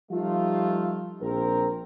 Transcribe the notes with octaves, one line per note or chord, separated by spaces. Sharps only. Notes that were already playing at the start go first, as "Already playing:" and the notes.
F3 G3 A3 D#4 F4
A#1 C4 A#4